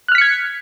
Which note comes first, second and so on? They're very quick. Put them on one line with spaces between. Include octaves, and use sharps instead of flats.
F#6 F6 B6 C#7 G#6